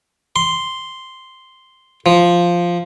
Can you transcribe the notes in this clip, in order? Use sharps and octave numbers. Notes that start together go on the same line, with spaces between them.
C6
F3